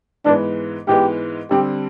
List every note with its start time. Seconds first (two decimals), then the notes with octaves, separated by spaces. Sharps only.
0.25 G#2 E3 G#3 B3 D4
0.87 G#2 E3 G#3 B3 G4
1.51 D3 G3 C4 G4